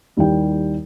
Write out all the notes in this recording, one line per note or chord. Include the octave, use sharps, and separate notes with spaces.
D#2 D#3 G3 E4 G5